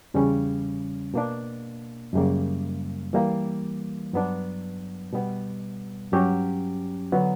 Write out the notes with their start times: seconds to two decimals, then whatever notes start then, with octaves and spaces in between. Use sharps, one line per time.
0.14 E2 C#3 G3 C#4
1.14 B2 A#3 D4
2.13 F#2 C#3 G3 A#3
3.13 E3 G3 A#3
4.13 G2 F#3 B3 D4
5.13 B2 G3 B3
6.12 G2 F#3 C#4 G4
7.12 D3 F#3 B3